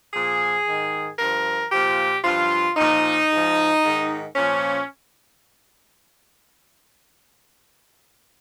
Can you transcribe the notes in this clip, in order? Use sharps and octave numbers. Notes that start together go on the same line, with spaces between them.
A#2 F3 G#4
G#2 D#3
G2 F3 A#4
A#2 F3 G4
G2 F3 F4
A#2 F3 D#4
G#2 F3
G#2 D#3
A#2 F3 C#4